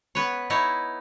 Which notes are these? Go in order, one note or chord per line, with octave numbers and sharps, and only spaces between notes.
B3 B4 C#5
D#4 E4 C#5